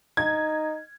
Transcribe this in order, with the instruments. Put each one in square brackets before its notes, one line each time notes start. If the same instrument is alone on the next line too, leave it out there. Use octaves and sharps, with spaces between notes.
[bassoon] D#4 [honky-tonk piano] G#6